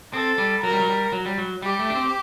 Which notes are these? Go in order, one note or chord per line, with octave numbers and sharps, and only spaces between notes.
C4 A4
G3
F#3 A#4
G3
F#3
G3
F#3
G3
F#3
G3 G4
A3
D4
C4